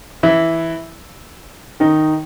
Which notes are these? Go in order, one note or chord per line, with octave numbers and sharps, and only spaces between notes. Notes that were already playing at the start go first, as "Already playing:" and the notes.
E3 E4
D#3 D#4